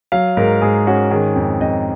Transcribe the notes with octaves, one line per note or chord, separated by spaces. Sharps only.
F#3 F5
G#2 A#4
G#2 G#4
C#4 F#4
D#3 G#4
F2
F2 D#5